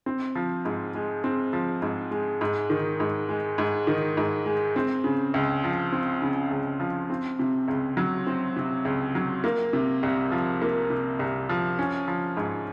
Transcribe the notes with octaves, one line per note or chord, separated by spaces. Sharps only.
C4
F3
G#2
G#3
C4
F3
G#2
G#3
G#2
D#3
G#2
G#3
G#2
D#3
G#2
G#3
C4
C#3
C#2
F3
C4
C#3
C#2
F3
C4
C3
C#2
F#3
C4
C3
C#2
F#3
A#3
C3
C2
F3
A#3
C3
C2
F3
C#4
F3
G#2